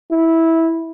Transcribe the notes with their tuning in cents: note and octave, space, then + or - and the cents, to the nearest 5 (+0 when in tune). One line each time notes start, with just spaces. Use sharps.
E4 -10